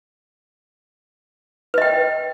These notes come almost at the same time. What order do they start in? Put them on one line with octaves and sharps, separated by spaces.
B4 D#5 G5